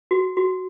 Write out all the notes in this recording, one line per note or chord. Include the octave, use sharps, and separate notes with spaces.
F#4
F#4